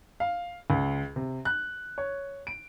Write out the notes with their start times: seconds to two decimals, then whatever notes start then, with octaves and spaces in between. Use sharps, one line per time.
0.20 F5
0.70 C#2
1.16 C3
1.45 F#6
1.98 C#5
2.47 D7